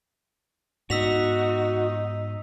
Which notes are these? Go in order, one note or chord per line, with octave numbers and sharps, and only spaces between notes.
G#2 B3 D#4 F#4 E6 B6 F7